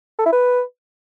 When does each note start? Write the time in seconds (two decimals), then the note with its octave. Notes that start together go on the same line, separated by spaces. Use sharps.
0.19 A4
0.26 E4
0.33 B4